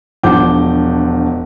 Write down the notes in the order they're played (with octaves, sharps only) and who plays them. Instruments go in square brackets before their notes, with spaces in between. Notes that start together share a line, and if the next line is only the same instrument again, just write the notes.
[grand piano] E1 F3 D4 F#5 D6 G6